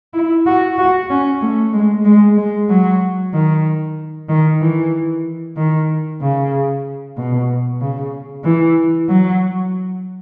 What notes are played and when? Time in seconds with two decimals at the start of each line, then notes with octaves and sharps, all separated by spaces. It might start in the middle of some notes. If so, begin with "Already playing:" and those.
0.14 E4
0.46 F#4
0.78 F#4
1.10 C#4
1.41 A3
1.73 G#3
2.05 G#3
2.37 G#3
2.69 F#3
3.34 D#3
4.29 D#3
4.61 E3
5.57 D#3
6.21 C#3
7.17 B2
7.81 C#3
8.44 E3
9.09 F#3